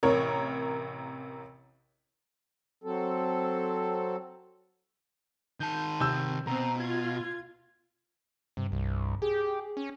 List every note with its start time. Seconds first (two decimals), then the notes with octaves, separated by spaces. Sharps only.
0.03 A1 C3 A#4 C#5
2.84 F#3 C4 A4
5.60 D#3 A5 G6
6.00 C3 E6 G6
6.47 B2 C4 A#5
6.80 F4 G#6
8.57 G2 C3
8.72 C2
9.22 G4 G#4
9.77 C#4